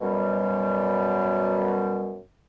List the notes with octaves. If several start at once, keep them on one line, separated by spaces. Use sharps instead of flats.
F#2 B2 G3